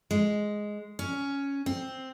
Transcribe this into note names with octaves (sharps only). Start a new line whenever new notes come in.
G#3
C#4
C4